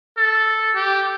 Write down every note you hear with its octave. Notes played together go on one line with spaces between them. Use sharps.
A4
G4